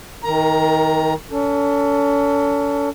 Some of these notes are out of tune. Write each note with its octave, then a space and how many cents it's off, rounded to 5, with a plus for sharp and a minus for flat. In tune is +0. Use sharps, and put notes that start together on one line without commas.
D#3 +30 A#4 -10 A#5 +20
C#4 +40 A4 +25